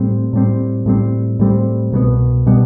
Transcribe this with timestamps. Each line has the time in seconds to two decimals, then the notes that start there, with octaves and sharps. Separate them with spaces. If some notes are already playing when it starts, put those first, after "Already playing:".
Already playing: A2 G3 C4
0.33 A2 G3 C4
0.86 A2 G3 C4
1.40 A2 G3 C4
1.92 C2 B2 G3 B3
2.47 B2 G3 B3